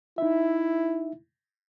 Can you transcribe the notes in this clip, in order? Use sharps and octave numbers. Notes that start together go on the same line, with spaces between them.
D#4 E4 E5